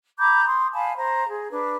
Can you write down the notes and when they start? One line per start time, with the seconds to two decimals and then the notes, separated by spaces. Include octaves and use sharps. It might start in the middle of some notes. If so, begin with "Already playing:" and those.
0.19 A#5 B5 D6 G6
0.46 C6 D#6
0.74 F5 G#5 A5 B5
0.97 C5 A#5
1.29 G#4
1.51 D4 B4